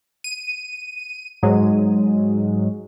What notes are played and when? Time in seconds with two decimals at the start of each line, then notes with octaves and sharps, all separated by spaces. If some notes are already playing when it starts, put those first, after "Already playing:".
0.24 D#7
1.43 G#2 F#3 G#3